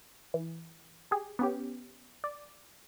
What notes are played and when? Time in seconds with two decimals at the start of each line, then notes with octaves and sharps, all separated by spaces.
0.34 E3
1.11 G4 G#4
1.39 B3 C#4 G4
2.24 D5